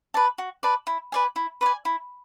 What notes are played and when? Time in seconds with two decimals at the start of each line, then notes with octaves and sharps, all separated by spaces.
0.14 B4 D5 A5
0.38 F#4
0.63 B4 D5 A5
0.87 E4
1.12 B4 D5 G#5
1.36 E4
1.61 B4 D5 G#5
1.85 E4